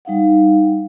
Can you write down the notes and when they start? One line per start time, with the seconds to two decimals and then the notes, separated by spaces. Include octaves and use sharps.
0.05 G3 D#4 F5 F#5